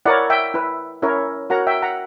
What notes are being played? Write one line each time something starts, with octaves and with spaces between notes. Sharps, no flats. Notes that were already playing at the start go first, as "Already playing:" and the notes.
E4 A#4 C#5 D5 F#5
E5 G5
E4 B4
C#4 E4 A#4 C#5
F#4 A#4 C#5 F#5 A#5
E5 G5
F#5 A#5